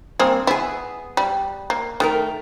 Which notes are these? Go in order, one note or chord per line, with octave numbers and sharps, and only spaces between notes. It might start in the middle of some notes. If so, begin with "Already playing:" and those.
G2 A#3 C4 G#4
B3 E4 G#4
G3
A#3
D#3 A3 A4 A#4